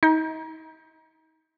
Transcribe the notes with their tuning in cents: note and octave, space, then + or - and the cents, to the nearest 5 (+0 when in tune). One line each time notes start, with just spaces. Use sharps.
D#4 +35